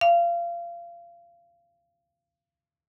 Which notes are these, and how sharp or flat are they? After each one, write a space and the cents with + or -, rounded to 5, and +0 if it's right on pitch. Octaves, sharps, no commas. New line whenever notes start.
F5 -25